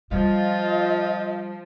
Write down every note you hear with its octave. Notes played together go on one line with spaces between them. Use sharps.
F3 G3 F4 D#5